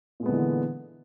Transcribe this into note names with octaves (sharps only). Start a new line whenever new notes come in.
A#2 D3 E3 G#3 B3